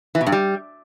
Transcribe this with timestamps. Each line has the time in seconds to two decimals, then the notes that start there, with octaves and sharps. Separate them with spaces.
0.15 E3
0.21 B2
0.27 G2
0.32 G3